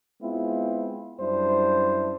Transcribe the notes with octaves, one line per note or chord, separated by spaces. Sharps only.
G#3 B3 C4 E4 F4
F#2 G3 D4 E4 C5